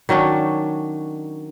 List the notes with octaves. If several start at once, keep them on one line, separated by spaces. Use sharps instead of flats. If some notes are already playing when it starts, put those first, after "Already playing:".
D#3 F#3 C#4 D4